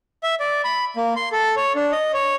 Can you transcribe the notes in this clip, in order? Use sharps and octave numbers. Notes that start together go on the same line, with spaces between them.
E5
D5
B5
A#3
C6
A4
C#5
D4
D#5
C#5